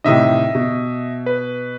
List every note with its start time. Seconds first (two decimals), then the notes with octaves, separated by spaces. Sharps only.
0.04 A2 C3 D#3 D#5 E5 D#6
0.55 B2
1.26 B4